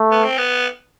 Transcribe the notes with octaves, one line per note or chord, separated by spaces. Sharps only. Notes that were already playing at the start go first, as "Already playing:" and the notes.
Already playing: A3
B3
C4
B3